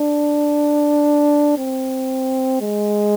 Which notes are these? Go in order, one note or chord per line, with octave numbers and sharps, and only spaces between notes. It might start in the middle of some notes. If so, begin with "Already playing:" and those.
Already playing: D4
C4
G#3